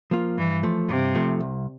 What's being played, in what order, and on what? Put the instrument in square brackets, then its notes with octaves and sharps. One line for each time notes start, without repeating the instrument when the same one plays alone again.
[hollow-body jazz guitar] F3 A#3 F4
[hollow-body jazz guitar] G2 [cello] E3
[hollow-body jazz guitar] F3 A3
[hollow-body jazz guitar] G2 [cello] C3
[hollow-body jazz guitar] F3 A3
C2